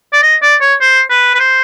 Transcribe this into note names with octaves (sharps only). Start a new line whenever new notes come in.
D5
D#5
D5
C#5
C5
B4
B4
C5